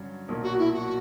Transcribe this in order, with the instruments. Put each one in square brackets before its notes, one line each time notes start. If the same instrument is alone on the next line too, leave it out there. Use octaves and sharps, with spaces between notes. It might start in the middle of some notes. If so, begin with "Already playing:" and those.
Already playing: [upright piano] G2 D3 F#3 C#4
B1 A#2 F#3 A#3
[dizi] F#4
E4
F#4